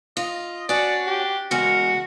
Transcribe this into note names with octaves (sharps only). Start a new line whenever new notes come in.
F4 D#5
C#4 D4 F#4 D5
G4
E2 C#3 G#3 F#4 A#4